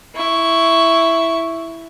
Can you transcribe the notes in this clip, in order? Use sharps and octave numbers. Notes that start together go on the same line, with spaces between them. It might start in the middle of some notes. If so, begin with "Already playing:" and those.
E4 C#6